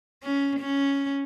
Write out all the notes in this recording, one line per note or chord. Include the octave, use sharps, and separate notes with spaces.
C#4
C#4